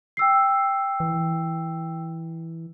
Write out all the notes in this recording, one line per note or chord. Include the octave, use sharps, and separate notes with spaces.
G5 E6 C7
E3